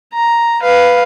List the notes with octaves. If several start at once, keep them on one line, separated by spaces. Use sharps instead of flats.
A#5
B4 F5